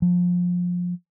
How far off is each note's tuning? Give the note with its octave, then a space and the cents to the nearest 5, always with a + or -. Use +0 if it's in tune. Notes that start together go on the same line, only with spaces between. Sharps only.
F3 +25